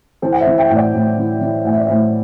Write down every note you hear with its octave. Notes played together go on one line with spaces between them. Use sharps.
E3 A4 C5
F#5
C5 E5
E3
E5 G5
A2 G5
D5 F#5
A2
E3
E3
A2 F#5
E5
D5
A2 C5 E5